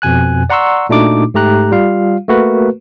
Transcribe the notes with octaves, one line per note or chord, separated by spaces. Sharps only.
F2 B2 G#5 F#6
D5 F#5 A#5 C6 C#6 E6
A#2 A3 D4 D#4 F#4 D6
G#2 A3 G4 A#5 F#6
G3 F4 F5
A3 A#3 F#4 A#4 B4